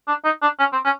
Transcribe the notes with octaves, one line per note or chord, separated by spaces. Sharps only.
D4
D#4
D4
C#4
C4
C#4